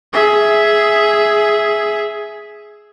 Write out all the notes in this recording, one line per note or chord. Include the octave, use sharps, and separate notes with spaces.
G#4 E5